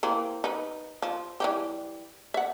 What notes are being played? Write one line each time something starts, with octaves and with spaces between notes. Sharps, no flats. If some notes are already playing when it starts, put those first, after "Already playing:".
E3 A#3 C4
D#4 B4
F3
E3 G3 G4
E5 F#5